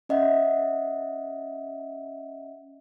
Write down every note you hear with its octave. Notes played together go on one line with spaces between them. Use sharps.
C#4 D#5 E5 F#5